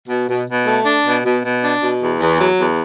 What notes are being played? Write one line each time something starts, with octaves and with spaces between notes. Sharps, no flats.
B2
B2
B2
A3
D4
B2
B2
B2
D4
B2
E2
E2
F#3
E2